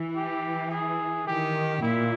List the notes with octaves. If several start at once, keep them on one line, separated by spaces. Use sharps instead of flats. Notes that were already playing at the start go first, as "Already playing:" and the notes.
Already playing: E3
G4
G#4
D#3 G4
A#2 E4